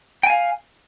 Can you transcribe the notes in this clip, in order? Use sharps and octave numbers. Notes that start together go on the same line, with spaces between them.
F5 G5 G#5